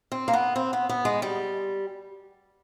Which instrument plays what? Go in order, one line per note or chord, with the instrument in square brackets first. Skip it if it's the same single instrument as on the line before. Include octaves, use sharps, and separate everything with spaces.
[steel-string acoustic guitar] C4
A#3
B3
C4
B3
B3
G#3
G3